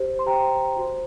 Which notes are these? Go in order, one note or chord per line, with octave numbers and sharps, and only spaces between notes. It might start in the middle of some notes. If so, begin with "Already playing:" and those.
Already playing: G4 C5
C6
G4 C5 G5 A#5
F#4 C5